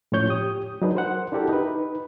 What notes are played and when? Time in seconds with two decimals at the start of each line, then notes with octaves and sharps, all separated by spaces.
0.12 A2 F3 C#4 C#5 G6
0.29 G4 D#6
0.82 F#3 D4 D#4 G#4 B4
0.95 A#4 C5 F#5
1.32 D4 E4 F#4 G4 A4 A#4
1.49 D#4 B4